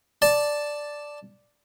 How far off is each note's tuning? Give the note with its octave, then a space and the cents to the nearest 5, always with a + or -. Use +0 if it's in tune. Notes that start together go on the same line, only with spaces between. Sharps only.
D5 +0 A5 +0